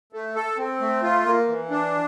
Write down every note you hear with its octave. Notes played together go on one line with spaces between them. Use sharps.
A3
A4
C4
A3
F4
A#3
E3
D4